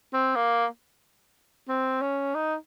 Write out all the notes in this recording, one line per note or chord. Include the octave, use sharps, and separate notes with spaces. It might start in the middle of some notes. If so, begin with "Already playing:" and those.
C4
A#3
C4
C#4
D#4